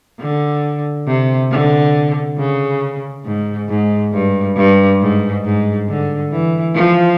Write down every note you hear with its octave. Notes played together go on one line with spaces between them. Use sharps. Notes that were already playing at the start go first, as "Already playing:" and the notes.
D3
C3
D3
C#3
G#2
G#2
G2
G2
G#2
G#2
D3
E3
F3